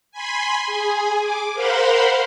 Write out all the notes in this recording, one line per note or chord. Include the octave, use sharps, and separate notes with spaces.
G#5 B5 C6
G#4 G#5
D6
A#4 C5 F5 F#5 B5 C6